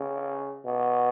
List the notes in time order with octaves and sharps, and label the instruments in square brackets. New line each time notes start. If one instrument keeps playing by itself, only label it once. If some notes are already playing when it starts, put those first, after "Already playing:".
Already playing: [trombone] C#3
B2